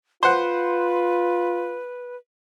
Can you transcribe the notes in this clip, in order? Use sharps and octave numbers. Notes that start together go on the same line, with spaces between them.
F4 B4 C5 F#5